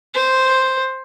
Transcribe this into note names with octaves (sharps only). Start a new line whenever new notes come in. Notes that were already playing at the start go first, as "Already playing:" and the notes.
C5